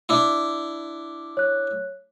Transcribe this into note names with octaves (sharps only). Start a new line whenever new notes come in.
D4 E4
C#5 F#6